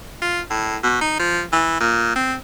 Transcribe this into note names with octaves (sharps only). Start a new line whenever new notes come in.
F4
A2
B2
D#4
F3
E3
A#2
C4